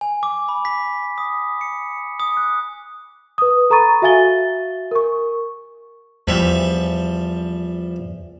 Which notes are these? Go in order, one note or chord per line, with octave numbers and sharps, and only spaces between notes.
G#5
D6
B5
B6
D#6
C#7
D#6
F#6
B4 D#6
A4 A#5 B5 C#6 A6 D#7
F#4 E5 F5 G#5 A6 G7
A#4 C#6
E2 F3 G3 E5